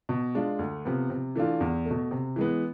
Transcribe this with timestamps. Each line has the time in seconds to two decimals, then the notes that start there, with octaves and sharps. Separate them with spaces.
0.09 B2
0.35 G#3 D4 F4
0.59 D2
0.85 C3 F3 B3
1.10 C3
1.35 E3 A3 D4 F4
1.61 E2
1.85 A3
1.91 B2
2.11 C3
2.36 E3 G#3 B3